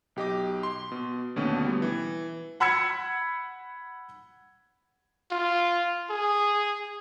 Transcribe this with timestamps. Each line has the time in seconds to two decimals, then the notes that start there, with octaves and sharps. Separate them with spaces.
0.16 B1 G4 D#5 D6
0.63 C6
0.92 B2
1.36 D#2 B2 D3 A3 C#4
1.64 G3 B3
1.82 E3
2.60 F#5 B5 E6 G#6 C#7
5.31 F4
6.10 G#4